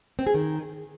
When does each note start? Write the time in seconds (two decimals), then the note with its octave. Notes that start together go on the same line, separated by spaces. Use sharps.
0.19 C4
0.27 G#4
0.34 D#3